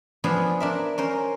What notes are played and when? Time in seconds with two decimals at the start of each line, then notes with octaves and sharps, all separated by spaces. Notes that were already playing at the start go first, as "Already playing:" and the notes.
0.24 F3 B3 D4 F4 G#4 C5
0.60 D4 A#4 E5
0.98 C#4 A#4 C5